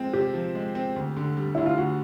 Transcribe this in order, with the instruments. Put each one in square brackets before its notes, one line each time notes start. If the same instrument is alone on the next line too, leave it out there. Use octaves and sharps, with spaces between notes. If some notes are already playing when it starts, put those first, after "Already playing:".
Already playing: [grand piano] F3 G#3 C4
[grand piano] C3 [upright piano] G4
[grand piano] F3
G#3
C4
D2
D3
G3
[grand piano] D2 [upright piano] E4
[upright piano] F4
[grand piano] D2 [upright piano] F#4